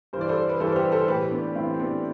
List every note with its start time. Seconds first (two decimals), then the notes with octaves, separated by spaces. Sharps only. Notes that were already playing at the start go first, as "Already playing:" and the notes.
0.13 G2 C5
0.17 E3 D5
0.29 A4 C5
0.49 B4
0.60 G2 E3 A4 C5
0.72 C5
0.76 G4 B4
0.92 A4 C5
1.08 A2 E3 G4 B4
1.31 B3 D4
1.55 A2 E3 C4 E4
1.74 C4
1.79 B3 D4